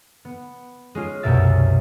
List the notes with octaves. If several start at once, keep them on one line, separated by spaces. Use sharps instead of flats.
B3
G#3 C#4 F4
C2 F#2 B2 A#3 E5 A6